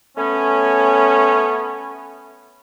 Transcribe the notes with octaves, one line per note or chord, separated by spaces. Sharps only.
A3 B3 C#4